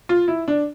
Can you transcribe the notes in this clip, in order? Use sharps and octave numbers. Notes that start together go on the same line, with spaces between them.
F4
E4
D4